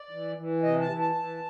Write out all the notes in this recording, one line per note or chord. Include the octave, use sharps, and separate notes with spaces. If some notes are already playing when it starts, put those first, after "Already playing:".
Already playing: D5
E3
E3
C3 D#5
A5
E3
A5
E3